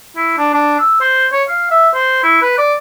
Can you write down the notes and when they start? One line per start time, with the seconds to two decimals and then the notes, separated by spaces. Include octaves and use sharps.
0.16 E4
0.38 D4
0.53 D4
0.79 E6
1.01 C5
1.32 C#5
1.48 F5
1.71 E5
1.94 C5
2.23 E4
2.42 B4
2.58 D5